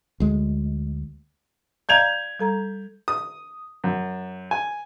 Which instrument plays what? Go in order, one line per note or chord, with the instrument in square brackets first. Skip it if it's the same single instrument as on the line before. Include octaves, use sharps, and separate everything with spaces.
[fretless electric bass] D2 G#3
[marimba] D5 F5 A#5 [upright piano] G6 G#6 F7
[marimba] G3 A4 A#5
[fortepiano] D#6
F#2
G#5